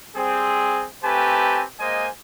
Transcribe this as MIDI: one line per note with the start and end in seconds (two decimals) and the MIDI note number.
0.17 0.87 55
0.17 0.87 60
0.17 0.87 68
1.04 1.64 57
1.04 1.64 60
1.04 1.64 67
1.04 1.64 71
1.04 1.64 80
1.04 1.64 81
1.80 2.08 56
1.80 2.08 58
1.80 2.08 72
1.80 2.08 75
1.80 2.08 80